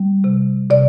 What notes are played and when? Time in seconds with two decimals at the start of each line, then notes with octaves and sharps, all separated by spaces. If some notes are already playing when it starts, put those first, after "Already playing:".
Already playing: G3
0.24 C3
0.70 C3 D5